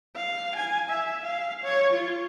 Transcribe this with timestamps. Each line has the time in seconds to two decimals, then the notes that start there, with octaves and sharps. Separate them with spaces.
0.16 F5
0.56 G#5
0.90 E5
1.25 F5
1.64 C#5
1.93 F4